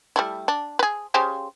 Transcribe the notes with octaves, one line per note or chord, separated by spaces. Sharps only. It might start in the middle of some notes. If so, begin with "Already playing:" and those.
G3 A3 E4
D4
G#4 B4
C#3 G4 C5